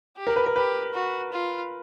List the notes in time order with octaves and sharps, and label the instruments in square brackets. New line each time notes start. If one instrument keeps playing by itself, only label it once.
[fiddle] G4
[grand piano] A#4
B4
A#4
[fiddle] G4 [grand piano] B4
[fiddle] F#4
F4